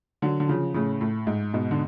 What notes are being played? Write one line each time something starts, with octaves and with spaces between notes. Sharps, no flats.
D3 F#3
D3
C#3 F3
A2 C#3
A2
G#2
G#2 B2
D3